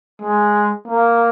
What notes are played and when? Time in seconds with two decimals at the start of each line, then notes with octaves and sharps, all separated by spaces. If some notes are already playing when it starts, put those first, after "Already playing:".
0.22 G#3
0.87 A#3